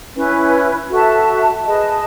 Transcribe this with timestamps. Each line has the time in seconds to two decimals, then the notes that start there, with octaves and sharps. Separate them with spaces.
0.14 C#4 E4 B4
0.89 F#4 A4 E5 A5
1.64 G#4 B4 D#5 A5